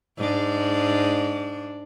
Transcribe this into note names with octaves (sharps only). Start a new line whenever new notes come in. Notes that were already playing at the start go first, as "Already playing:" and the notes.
G#2 D4